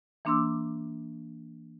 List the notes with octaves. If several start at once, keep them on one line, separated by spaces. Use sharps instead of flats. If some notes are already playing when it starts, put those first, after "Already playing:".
E3 A#3 D4 C6 D6 E6